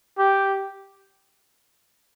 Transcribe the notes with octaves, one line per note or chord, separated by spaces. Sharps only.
G4